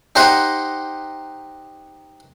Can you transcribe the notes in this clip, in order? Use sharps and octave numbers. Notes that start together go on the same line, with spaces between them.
D#4 G4 C5 D#5 F#5